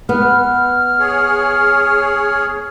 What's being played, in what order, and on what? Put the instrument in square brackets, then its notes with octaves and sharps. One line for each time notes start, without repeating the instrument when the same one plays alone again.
[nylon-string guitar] B3 [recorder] F6
[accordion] G#4 C#5